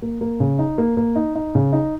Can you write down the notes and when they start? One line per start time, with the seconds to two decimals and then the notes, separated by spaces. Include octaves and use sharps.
0.02 A#3
0.21 A#3
0.40 C#3
0.59 D#4
0.78 A#3
0.97 A#3
1.16 D#4
1.35 D#4
1.55 C#3
1.73 D#4